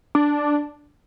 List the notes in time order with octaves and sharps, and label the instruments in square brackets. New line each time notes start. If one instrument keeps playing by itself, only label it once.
[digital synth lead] D4